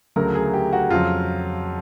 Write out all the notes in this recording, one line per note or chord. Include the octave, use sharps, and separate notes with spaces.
D2 C#3 F#3 A3 A#4
G#4
G4
F#4
F2 C#3 F#3 F4